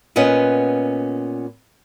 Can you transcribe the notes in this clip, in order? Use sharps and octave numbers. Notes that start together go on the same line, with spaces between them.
A#2 B3 C#4 D#5 F#5